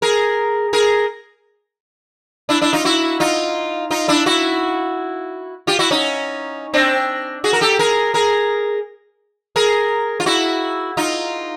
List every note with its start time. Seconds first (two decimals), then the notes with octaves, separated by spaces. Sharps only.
0.02 G#4 A#4
0.73 G#4 A#4
2.49 D4 E4
2.61 D4 E4
2.73 D#4 F4
2.85 E4 F#4
3.20 D#4 F4
3.91 D#4 F4
4.08 D4 E4
4.26 E4 F#4
5.67 F4 G4
5.79 E4 F#4
5.91 C#4 D#4
6.74 C4 D4
7.44 F#4 G#4
7.53 A#4
7.61 G4 A4
7.79 G#4 A#4
8.14 G#4 A#4
9.56 G#4 A#4
10.20 F4
10.26 E4 F#4
10.97 D#4 F4